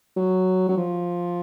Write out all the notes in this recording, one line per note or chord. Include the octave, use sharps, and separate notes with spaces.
F#3
F#3
F3